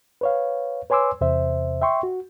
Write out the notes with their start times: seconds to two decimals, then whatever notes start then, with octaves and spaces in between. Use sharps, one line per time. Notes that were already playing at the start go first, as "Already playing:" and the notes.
0.21 B4 C#5 F5
0.90 B4 C#5 G#5 C6 D6 E6
1.21 E2 C3 C5 E5
1.81 E5 G5 C6 C#6
2.03 F#4